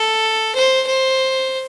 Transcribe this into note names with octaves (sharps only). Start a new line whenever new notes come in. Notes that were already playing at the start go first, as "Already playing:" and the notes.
Already playing: A4
C5
C5